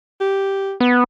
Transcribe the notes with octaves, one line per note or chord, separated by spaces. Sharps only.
G4
B3